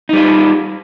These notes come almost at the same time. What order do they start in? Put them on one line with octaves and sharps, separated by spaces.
D#4 G3 F4